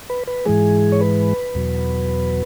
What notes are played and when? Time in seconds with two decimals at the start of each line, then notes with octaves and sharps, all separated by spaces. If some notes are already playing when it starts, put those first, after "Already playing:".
0.10 B4
0.27 B4
0.45 G#2 E3 G#3 G#4
0.92 C#5
1.01 B4
1.55 E2 B2 F#3